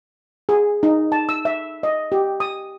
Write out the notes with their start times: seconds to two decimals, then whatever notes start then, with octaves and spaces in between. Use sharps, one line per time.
0.49 G#4
0.83 D#4
1.12 A5
1.29 E6
1.45 E5
1.83 D#5
2.12 G4
2.40 D#6